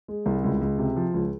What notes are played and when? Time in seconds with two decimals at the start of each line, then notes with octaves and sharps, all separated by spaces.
0.08 G#3
0.26 C2
0.44 C#2
0.61 C#2
0.78 C3
0.96 F3
1.14 C#2